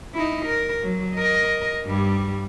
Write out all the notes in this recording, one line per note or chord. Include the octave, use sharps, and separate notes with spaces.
D#4 E4
A#4
F#3
A#4 D#5
G2 G3